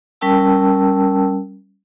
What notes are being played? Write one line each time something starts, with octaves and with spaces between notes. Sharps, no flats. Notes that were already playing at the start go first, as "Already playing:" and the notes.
G3 C#4 A#4 G5 A5 E6